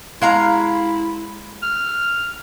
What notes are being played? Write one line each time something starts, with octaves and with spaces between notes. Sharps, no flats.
G#3 E4 F5 A#5
F6